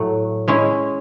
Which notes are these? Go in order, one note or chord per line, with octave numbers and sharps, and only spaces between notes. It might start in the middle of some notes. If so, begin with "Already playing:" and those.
Already playing: A2 F#3 A3
G#3 C#4 E4